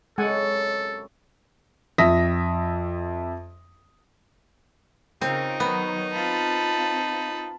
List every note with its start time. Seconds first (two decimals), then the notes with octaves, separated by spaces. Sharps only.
0.18 F#2 C3 G#3 A4 C#5 F#5 G#5
1.98 F2 E5 D#6 A#6 B6
5.21 C#3 C4 D#4 F4 A#4
5.60 D#3 F#3 B3
6.13 C4 F4 A5 B5